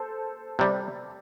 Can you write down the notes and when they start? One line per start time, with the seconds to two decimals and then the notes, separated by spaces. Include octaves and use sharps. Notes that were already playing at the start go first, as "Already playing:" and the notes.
Already playing: A4 C5
0.59 C3 G3